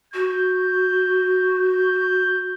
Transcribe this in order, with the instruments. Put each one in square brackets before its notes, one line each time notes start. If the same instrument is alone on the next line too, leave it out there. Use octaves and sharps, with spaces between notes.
[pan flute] F#4 [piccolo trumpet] G6
[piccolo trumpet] G6